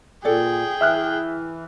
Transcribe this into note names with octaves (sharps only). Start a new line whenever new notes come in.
A#2 G#4 A4 D5 G5
E3 E5 F6 F#6